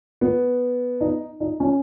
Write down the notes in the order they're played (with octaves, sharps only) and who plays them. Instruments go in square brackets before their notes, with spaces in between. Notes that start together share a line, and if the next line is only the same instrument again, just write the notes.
[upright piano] B3
D#4
D#4
C#4